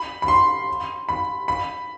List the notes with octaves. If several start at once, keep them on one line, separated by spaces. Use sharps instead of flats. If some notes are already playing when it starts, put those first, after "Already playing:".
Already playing: B5
B5
C6
B5
B5